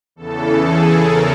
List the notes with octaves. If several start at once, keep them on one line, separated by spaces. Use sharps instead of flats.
E2 C#3 E3 A4
G#4
A#4